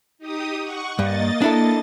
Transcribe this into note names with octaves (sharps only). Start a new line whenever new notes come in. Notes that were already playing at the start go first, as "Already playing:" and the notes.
D#4 G4 D#6
F#5 C#6
G2 A#3 D#5 A6
D4 E4 A4